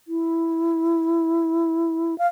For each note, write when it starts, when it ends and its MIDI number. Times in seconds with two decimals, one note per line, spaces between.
0.08 2.18 64
2.18 2.26 77